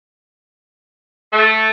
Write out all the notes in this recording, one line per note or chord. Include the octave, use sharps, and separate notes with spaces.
A3